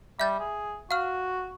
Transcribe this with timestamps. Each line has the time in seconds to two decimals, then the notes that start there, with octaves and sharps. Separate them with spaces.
0.20 G3 E5 G6 A6
0.39 G#4
0.91 F#4 F5 F6